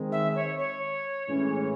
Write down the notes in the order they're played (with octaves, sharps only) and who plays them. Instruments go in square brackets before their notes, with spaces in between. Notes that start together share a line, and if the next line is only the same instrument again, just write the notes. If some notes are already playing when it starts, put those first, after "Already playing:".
Already playing: [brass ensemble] D#3 G#3 C4
[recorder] E5
C#5
C#5
[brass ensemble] A2 E3 G#3 C#4